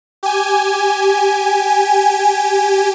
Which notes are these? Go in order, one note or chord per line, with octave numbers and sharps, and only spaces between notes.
G4 G#5